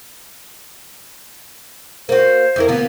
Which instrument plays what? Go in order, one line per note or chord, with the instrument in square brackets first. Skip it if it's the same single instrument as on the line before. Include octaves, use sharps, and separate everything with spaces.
[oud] A#3 F#4 [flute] C5
[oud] F2 E4 A#4
D2 A#3 B3